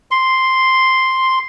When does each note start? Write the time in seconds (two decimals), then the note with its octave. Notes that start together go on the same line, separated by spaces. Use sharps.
0.11 C6